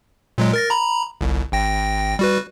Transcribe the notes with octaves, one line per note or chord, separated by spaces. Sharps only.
A#2 F#3 G#3
A#4 A6 A#6
A#5 B5
G1 C2
G#1 G5 A#6
G3 F#4 B4